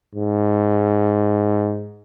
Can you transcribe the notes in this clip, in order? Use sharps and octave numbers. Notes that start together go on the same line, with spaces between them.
G#2